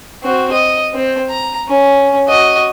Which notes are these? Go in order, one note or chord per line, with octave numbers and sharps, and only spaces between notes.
C4 F#4
D#5
C4
A#5
C#4
F#4 D#5